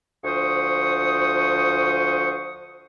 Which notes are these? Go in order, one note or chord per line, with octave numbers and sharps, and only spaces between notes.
D2 F3 C5 C#6 D#6